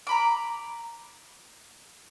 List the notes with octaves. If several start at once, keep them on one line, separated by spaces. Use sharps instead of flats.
A#5 B5 D6